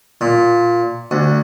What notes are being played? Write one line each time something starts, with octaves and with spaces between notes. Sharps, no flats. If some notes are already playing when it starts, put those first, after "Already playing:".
A#2
D2